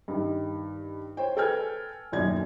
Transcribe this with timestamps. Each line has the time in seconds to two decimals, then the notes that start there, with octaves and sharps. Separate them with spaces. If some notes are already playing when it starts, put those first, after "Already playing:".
0.08 G2 D#3
1.17 C5 C#5 G5
1.37 A4 B4 G5 G#5 F6 G#6
2.12 D#1 B1 F#2 D5 G#6